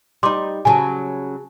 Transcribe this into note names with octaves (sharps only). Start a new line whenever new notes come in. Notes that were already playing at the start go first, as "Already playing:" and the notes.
G3 D#4 C6 D6
C#3 F#3 G#5 A5